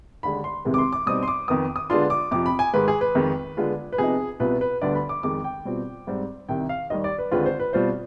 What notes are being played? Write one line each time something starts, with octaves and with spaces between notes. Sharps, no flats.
D#2 D3 G#3 B5
C6
C2 C3 D#3 G#3 B3
D6
C6
D6
B2 G3 C4 D#4 D#6
C6
D6
F2 D#3 B3 D#6
D#6
D3 G#3 B3 D4 F4 C6
D6
F2 C3 F3 D6
B5
G#5
G#2 D#3 G#3 B4
G#4
B4
F2 D#3 G#3
D3 G#3 B3 F4
B4
C3 F3 B3 D#4 G#4
C2 B2 B3 F4 B4
B4
D2 D3 G3 B3 D4 D5
B5
D6
F2 D#3 G#3 D6
G5
B2 G3 C4 F4
G#2 G3 C4
C2 C3 D#3 G5
F5
D#2 D#3 G3 D#5
D5
B4
D#2 D3 G#3 C4 F4 B4
C5
B4
B2 G3 C4 F4 C5